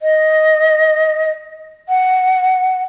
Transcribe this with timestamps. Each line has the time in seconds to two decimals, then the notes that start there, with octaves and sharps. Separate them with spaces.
0.02 D#5
1.89 F#5